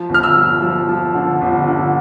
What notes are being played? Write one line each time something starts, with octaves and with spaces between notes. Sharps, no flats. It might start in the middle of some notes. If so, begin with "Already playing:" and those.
Already playing: F3
G1
F6
E6
F3
F3
F3
D3
G1
D3